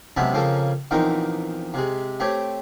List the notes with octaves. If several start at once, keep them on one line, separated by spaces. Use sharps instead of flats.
F#2 C3 G#3 B3 E5 A5
F2 C#3 A#3 C#4 A4 F5
A#1 E2 C4 D#4 A#4
C3 G#3
A3 C4 G4 C#5